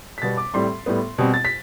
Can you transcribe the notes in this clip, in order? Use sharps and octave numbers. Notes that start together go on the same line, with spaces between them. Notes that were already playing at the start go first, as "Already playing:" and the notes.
B6
B2 G3 B3 A6
D6
A2 G3 C4 C6
A2 G3 B3
B2 G3 C4
A6
B6